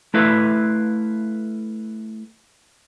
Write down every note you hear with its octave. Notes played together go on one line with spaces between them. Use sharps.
A3 E4 B4 E5 F5